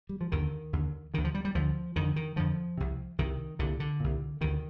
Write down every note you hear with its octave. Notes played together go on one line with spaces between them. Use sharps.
G3
F3
D#2 D3 D#3
D#2 D3
D2 D3 D#3
F3
G3
G3
D2 D3 F3
F2 D3 D#3
D#3
F2 D3 F3
C2 C3
C2 C3 D#3
C2 A#2 D3
D3
C2 A#2
D2 C3 D#3